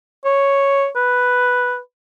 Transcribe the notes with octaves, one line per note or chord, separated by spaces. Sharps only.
C#5
B4